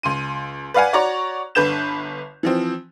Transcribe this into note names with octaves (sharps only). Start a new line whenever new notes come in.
C#2 C6 D#7
B4 D5 F5 F#5 G#5
F#4 C#5 D5 A#5 C#6
G1 D3 B4 G6 E7
E3 F3 C4